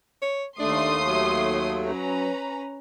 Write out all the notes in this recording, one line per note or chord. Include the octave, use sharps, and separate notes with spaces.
C#5
D#2 A3 D4 C6 D#6 C7
F#3
C#4 B4 A#5